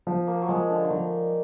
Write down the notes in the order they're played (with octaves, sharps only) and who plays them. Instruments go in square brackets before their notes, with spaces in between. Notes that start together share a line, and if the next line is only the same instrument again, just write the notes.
[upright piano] F3
[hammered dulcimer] A#3
F#3
[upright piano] F3 [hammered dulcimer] G#3
[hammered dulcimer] D3
D3
[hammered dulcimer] D#3 [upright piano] F3